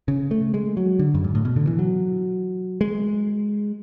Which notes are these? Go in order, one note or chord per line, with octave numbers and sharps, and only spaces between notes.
C#3
A3
G#3
F#3
D3
F#2
G#2
A2
B2
D3
E3
F#3
G#3